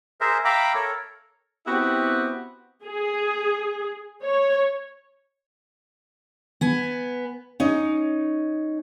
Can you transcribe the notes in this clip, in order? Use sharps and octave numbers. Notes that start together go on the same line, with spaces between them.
G#4 A#4 C5 E5
E5 F5 G5 A#5 B5 D6
A4 A#4 C#5
B3 C4 E4 F#4 G4
G#4
C#5
B3 G#5
C#4 D#4